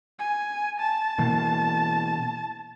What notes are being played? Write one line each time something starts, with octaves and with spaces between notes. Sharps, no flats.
G#5
A5
B2 E3 A#3